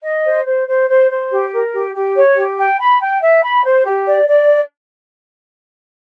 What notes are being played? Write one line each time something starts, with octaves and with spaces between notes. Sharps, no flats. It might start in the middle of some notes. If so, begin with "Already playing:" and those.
D#5
C5
C5
C5
C5
C5
G4
A#4
G4
G4
C#5
G4
G5
B5
G5
E5
B5
C5
G4
D5
D5